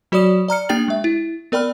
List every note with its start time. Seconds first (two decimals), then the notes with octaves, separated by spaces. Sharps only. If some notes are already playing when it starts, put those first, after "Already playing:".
0.12 F#3 F#4 C#5 D5 D#6 E7
0.48 D5 A#5 F6 C#7
0.69 A#3 D4 G4 G5 A6 F#7
0.88 G#3 E5
1.04 E4
1.52 B3 A#4 D5 G5 B5 F6